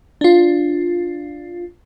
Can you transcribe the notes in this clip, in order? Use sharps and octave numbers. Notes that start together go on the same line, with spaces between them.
D4 F4